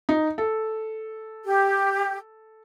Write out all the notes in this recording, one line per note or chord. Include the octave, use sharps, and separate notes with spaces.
D#4
A4
G4